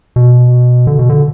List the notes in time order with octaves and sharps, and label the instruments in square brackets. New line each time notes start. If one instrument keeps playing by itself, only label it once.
[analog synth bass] B2
D3
B2
D3